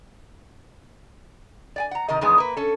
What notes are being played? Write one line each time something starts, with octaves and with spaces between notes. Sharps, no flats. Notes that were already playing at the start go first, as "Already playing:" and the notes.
D5 G5 G#5
F#5 A#5
C3 D#3 A#4 D#5
E2 G2 D#3 G#3 B3 G#4
A#3 B4
C#4 A4